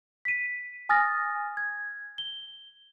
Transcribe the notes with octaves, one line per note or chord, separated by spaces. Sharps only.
B6 D#7
G#5 D#6 F6 A6 A#6
G#6
G7